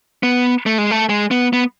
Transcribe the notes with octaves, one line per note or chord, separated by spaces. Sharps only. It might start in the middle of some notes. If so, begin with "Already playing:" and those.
B3
A3
G#3
A3
G#3
B3
B3